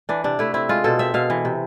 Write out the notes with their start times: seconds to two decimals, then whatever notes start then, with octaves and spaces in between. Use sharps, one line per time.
0.09 E3 D4
0.24 C3 D4
0.39 A3 E4
0.54 C4 E4
0.69 G#3 F4
0.84 B2 A4
0.99 C4 E5
1.14 B2 F5
1.30 E3
1.45 C3